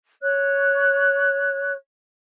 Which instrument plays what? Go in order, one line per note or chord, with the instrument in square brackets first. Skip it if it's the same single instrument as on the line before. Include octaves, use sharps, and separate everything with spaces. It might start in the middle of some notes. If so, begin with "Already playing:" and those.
[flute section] C#5 F#6